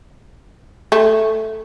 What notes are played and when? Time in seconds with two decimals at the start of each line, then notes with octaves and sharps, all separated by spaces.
0.92 A3